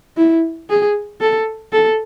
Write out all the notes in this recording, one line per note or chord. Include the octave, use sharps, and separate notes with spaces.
E4
G#4
A4
A4